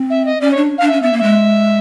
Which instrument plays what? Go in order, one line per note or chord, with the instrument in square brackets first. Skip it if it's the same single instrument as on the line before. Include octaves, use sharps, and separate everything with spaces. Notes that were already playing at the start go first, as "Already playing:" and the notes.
Already playing: [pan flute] C4
[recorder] E5
D#5
[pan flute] C#4 [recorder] D5
[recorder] C#5
[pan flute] D4
[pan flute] D4 [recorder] F5
[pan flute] C#4 [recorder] E5
[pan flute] B3 [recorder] E5
[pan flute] A#3
[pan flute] G#3 [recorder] E5